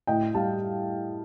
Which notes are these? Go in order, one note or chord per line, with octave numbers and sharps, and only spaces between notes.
A2 D#5 G5
G3 F5 A5